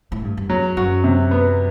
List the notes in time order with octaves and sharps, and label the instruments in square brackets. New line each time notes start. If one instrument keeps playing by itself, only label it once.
[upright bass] A2
G2
F#2
[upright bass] E2 [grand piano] F#3
[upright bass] F#2 [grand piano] F#4
[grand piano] C3
B3